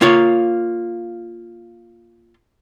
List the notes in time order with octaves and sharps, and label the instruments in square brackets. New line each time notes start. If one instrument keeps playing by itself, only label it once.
[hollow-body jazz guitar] A#3 F4 C#5